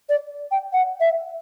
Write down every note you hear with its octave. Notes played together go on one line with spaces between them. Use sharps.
D5
G5
F#5
E5